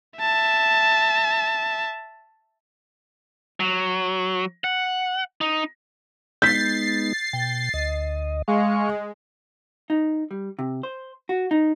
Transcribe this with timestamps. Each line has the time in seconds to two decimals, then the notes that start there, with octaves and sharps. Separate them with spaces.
0.20 E5 A5
3.60 F#3
4.64 F#5
5.41 D#4
6.42 G#3 B3 D#4 G6 A6 B6 C7
7.33 B2 G5
7.74 D2 D#5
8.48 G#3 F5 C#6
9.90 D#4
10.31 G3
10.59 C3
10.83 C5
11.29 F#4
11.51 D#4